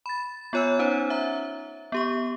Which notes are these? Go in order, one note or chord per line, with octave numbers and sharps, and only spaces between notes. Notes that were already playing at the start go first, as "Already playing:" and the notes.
B5 A6
B3 F4 C#5 G#5 E6
C#4 D#4 C5
E5 A#5
B3 G4 C#6